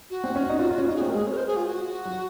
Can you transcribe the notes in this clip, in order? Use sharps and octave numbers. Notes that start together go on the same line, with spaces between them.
F#4
C4
C#4
D#4
F4
F4
C#4
D#4 F4
G#4
C4 F#4
A#4
G#3 G#4
C#5
A#4
C5
G#4
F4
F#4
F#3